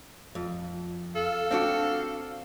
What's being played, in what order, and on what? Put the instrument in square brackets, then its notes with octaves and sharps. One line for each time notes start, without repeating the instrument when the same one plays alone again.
[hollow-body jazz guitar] F2
[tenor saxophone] A4 [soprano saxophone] F5
[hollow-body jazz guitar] C4 D4 F#4 [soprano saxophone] F5